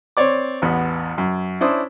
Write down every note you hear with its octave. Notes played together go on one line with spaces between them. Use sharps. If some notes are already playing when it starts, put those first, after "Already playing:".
C4 C#5 D5 D6
A1 E2 B3
F#2
C#4 D4 E4 C5 D#6